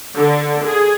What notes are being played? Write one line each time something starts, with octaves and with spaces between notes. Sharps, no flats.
D3
G#4